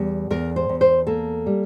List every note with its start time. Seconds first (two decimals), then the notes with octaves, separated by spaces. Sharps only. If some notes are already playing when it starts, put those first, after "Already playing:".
Already playing: E2 G3
0.30 E2 A#4
0.56 C5
0.69 E2
0.81 C5
1.07 A#3 A4
1.46 G3